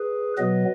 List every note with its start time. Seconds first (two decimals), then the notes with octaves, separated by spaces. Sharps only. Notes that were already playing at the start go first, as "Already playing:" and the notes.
Already playing: G#4 B4
0.38 B2 F#3 B3 B4 D#5